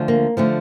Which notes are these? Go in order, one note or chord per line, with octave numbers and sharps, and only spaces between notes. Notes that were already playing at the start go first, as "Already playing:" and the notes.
Already playing: D2 D3 F3
A#3
D3 F3 A3